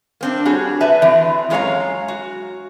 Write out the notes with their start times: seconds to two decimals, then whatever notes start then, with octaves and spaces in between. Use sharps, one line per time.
0.21 A#3 C4 D4
0.45 G3 F#4 G#4 C#5
0.81 B4 D5 E5 A5
1.02 E3 C4
1.50 F#2 G#3 F4 C#5 F5 A#5
2.08 F#4